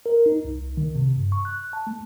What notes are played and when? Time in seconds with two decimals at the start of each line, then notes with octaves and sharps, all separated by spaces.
0.06 A#4
0.26 D#4
0.45 C2
0.77 D#3
0.95 C3
1.16 G2
1.32 C#6
1.45 F#6
1.73 A5
1.87 A3